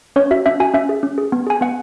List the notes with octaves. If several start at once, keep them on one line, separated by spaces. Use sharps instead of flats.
C#4 C#5
F#4 E5
C#4 E5
F#4 G#5
C#4 E5
G#4
C#4
G#4
B3
G#4 G#5
B3 F#5